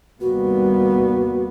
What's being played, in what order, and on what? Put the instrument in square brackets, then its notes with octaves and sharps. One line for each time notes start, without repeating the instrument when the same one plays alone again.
[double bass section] D#2 C3 G3 [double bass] A#3 B3 [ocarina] F#4